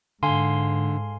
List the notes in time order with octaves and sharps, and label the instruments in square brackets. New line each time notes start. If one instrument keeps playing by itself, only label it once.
[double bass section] G#2 [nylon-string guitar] D3 [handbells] F5 G#5 C6